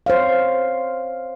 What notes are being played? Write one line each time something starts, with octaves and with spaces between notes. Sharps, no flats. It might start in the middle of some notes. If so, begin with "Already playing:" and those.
C5 C#5 F5